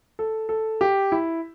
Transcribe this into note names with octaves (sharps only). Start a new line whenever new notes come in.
A4
A4
G4
E4